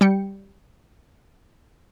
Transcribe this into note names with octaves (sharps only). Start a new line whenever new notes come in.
G3 G5 C#7